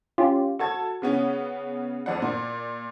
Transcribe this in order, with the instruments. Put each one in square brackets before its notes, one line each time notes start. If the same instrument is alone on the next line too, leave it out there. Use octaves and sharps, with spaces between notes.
[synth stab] C#4 F4 G4
[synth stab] F#4 [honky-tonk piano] A4 A5 G#6
[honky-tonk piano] C#3 B3 C#4
F2 D5 F#5
A#2 D5